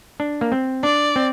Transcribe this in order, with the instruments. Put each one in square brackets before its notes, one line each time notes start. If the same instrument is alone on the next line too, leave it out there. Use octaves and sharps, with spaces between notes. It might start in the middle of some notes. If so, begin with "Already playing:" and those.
[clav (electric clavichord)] D4
A#3
C4
[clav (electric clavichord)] D4 [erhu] D5
[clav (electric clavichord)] C4